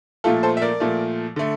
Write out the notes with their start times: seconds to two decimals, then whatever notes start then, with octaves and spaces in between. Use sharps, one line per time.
0.24 A#2 F3 A3 F4 A4
0.43 A4 C5
0.57 E5
0.62 A#4 D5
0.80 A#2 F3 A3
1.36 D3 A3